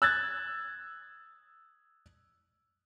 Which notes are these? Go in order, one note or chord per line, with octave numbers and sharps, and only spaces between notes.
E6 F#6 G#6 A6